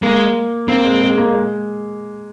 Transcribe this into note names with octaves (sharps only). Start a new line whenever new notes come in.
G#3 A#3
A#3 C4
G#3
G#3
A#3
G#3